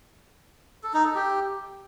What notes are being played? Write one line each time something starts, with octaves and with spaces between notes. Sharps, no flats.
A4
D#4
A4
G4